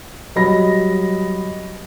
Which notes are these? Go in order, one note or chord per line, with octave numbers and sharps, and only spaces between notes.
F#3 G3 D#5 B5 A#6